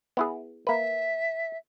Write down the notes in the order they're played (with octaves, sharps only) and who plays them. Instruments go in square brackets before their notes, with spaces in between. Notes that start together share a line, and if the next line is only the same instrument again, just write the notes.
[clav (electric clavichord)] B3 E4 G#4
[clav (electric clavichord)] A#3 B4 [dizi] E5